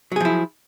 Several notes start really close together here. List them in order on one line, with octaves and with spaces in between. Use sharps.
F#3 G#4 F3 E4